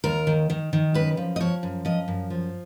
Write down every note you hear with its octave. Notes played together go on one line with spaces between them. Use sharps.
D#2 A#4
D#3
D#3
D#3
F#2 B4
F3
D#5
F3 C#5
F#2
F3 D#5
F#2
F3